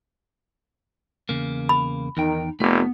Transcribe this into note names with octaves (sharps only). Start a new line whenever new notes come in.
E2 C#3 A#3
B5
E2 D#3 D#4 G5
F1 A3 B3